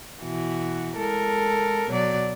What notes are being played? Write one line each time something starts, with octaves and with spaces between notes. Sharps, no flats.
B2 E3 F#4
G#3 A4 A#4
B2 F#3 D5